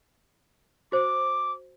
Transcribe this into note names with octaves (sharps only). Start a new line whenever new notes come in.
F#4 C5 D6